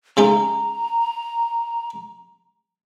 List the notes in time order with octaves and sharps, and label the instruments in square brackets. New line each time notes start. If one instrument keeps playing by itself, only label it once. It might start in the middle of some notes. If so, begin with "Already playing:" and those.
[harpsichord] C#3 G#3 D#4 [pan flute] A#5